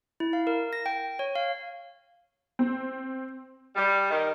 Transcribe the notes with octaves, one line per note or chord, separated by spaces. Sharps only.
E4
F5
A#4
A#6
G5
C#5
F5
C4
G3
D#3